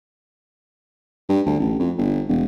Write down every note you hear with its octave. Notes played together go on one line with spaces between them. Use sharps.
G2
D2
A1
F2
G1
E1